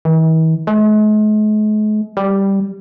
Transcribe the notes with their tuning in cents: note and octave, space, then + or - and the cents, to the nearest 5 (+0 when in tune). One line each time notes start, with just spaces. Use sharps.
E3 -45
G#3 +45
G3 +0